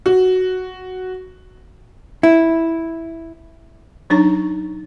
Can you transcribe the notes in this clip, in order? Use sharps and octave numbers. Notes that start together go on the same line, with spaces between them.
F#4
E4
F#3 D4 D#4 C#5